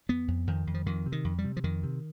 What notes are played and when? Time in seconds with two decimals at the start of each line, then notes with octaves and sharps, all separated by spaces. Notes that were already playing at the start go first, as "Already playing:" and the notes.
0.09 F2 B3
0.28 F2
0.47 F2 D#3
0.67 F2
0.74 F3
0.86 F2 D#3
1.06 C3
1.12 D#3
1.24 F2
1.39 G3
1.44 C3
1.57 F3
1.64 F2 D#3
1.83 C3